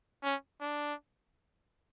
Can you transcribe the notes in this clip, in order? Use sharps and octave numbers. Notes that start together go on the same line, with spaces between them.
C#4
D4